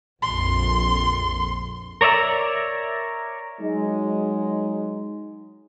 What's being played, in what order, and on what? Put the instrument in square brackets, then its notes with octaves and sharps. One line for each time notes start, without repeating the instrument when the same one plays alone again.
[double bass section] A#1 F2 [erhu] C6
[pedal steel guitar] A#4 C#5 D5 E5 A#5
[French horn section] F#3 G#3 D#4